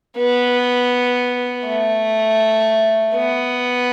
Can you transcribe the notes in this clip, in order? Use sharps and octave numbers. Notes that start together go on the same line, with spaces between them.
B3
A3
B3